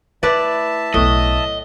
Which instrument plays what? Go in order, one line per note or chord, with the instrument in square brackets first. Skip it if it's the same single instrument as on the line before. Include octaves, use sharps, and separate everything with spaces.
[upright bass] A3 [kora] E4 B4 D5 [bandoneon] E5 A5
[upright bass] B1 E2 [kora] A2 [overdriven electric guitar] D#5